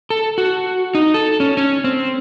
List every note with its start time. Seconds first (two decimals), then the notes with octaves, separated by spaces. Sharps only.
0.10 A4
0.38 F#4
0.95 D#4
1.14 A4
1.40 C#4
1.57 C#4
1.84 C4